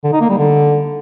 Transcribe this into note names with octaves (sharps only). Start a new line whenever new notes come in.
D3
D#4
A#3
G3
D3